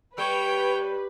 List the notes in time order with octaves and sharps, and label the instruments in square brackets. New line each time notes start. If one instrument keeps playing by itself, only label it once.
[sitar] G3 [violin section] B4 [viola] C#5 G5